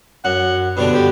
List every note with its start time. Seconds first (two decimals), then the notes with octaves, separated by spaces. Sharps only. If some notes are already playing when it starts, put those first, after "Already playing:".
0.25 F#2 F#5
0.77 G2 B2 D3 B4
0.94 G4